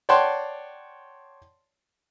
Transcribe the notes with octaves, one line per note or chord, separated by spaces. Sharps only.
C#5 D5 F#5 G5 A5 C6